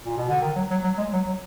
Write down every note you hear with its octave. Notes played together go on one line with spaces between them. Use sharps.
A#2
B2
D3
D#3
F#3
F#3
F#3
G#3
F#3
F#3